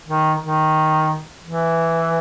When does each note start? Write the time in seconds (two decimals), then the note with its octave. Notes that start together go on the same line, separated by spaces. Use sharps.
0.09 D#3
0.43 D#3
1.45 E3